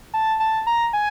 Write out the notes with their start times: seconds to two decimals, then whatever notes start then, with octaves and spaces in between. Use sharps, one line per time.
0.14 A5
0.40 A5
0.67 A#5
0.93 G#5